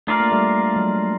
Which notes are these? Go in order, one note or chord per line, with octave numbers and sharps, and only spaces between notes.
A3 D4 F4 A#4 D5 F5
A#3
G3 A3
F#3 G#3